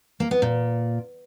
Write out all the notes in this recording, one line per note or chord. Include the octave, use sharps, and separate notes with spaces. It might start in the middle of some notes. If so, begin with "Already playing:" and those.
A#3
B3
A#2